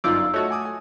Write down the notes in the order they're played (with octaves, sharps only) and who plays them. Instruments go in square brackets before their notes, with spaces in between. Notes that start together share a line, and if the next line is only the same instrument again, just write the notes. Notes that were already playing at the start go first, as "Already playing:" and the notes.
[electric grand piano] G1 F#2 G6 [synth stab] D#4 F4 D5 [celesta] E6
[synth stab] A3 F#4 [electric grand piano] C#5 D#5 A5
[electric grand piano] G#5 D6 D#6
G#5